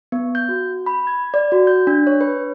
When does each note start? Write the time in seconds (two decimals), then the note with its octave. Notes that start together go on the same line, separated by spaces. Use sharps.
0.12 B3
0.35 G6
0.49 F#4
0.86 B5
1.07 G#6
1.34 D5
1.52 F#4
1.67 G6
1.87 D4
2.07 C#5
2.21 B4